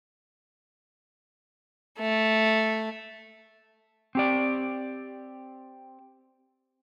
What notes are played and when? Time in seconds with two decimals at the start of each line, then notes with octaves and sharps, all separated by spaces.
2.00 A3
4.15 C4 G4 D5